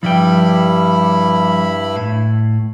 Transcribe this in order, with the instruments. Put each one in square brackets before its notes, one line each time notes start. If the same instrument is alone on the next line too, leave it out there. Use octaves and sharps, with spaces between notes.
[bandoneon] G2 E4 B5 [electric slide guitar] F3 G3 G5
[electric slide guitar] A2